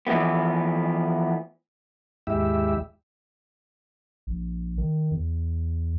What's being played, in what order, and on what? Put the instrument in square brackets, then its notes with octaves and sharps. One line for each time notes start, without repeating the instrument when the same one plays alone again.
[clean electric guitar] E3 F3 A3 B3
[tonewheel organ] D#2 G#2 G#3 E4 G4 E5
[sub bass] A#1
D#3
E2